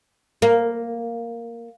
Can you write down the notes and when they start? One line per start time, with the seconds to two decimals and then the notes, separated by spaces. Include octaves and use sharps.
0.42 A#3